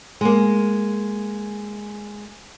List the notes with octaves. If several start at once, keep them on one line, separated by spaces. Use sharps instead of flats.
G#3 A#3